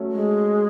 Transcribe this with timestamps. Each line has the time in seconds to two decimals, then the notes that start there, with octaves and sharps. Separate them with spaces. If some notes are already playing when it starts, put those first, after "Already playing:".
Already playing: F#3 A3 C#4
0.11 G#3